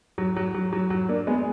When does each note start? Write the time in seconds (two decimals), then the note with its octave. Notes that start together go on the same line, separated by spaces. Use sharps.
0.18 F#3
0.36 F#3
0.55 F#3
0.73 F#3
0.90 F#3
1.09 A#3 D4
1.27 G#3 B3